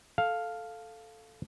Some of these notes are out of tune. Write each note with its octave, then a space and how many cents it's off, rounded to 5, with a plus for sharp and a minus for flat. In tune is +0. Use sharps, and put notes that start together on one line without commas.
A4 +0 F5 +0